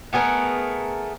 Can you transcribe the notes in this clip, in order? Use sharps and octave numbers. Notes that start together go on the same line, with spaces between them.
A3 B3 G#4 A#4